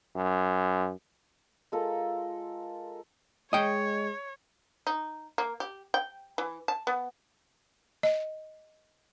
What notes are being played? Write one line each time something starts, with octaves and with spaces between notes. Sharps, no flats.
F#2
G#3 F4 A4 A#4
G#3 C#5 D#5 G5
D#4
A#3
G4
G5
E3
A5
B3
D#5